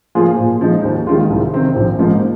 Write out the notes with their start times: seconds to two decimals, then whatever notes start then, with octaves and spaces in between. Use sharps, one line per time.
0.15 F3 A#3 F4 G#4
0.38 A#2
0.61 F3 G#3 D#4
0.84 D#2
1.07 D#3 G#3 F4
1.30 C2
1.53 C3 D#3 C4
1.76 A#1
1.99 G#2 F3 A#3 D#4